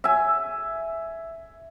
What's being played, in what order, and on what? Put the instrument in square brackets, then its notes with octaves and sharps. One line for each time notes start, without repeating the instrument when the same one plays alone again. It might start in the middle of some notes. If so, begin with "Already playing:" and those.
[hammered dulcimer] E5 G#5